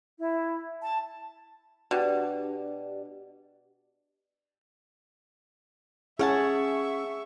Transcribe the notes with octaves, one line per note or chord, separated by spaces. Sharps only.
E4
A5
B2 D4 G4 D5
C#4 G#4 C#5 E5 F#5 A5 C#6